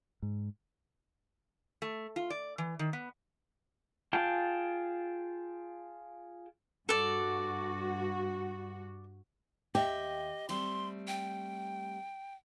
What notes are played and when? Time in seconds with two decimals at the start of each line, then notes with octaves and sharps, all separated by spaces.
0.22 G#2
1.82 A3
2.16 F4
2.30 D5
2.58 E3
2.79 D#3
2.93 B3
4.13 F4 G#4 G5 A5
6.89 G2 F#4 A4 D5
9.75 D#2 G4 D#5 E5
10.49 G3 A3 C4 C6
11.07 G5